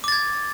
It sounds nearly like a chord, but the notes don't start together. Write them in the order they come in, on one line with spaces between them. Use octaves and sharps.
D6 A6 G#6